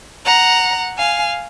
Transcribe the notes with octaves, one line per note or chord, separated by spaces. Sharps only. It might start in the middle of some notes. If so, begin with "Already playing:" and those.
F#5 A#5
F5 G#5